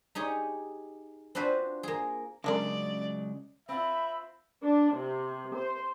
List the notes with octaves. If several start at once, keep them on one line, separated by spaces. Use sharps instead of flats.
D#4 G4 G#4 C#5
C4 D4 F4 F#4 B4 C5
A#3 G#4
C#3 F#3 G#3 C4 D4 A#4 D5
C4 F4 E5 B5
D4
C3
C5